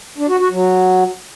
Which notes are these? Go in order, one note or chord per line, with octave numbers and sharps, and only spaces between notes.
D4
F#4
F#4
F#3